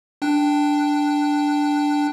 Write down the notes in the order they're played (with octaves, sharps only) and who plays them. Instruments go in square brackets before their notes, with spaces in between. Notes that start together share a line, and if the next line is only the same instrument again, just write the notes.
[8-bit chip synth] D4 G5 F#6